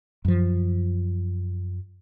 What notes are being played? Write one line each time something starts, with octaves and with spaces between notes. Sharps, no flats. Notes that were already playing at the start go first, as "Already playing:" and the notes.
F#2 F3